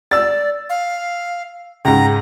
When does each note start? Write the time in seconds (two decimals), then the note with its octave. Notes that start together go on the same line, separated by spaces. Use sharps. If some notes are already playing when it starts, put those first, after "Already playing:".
0.11 D5 E6 A6
0.70 F5
1.85 C#2 G#2 A#5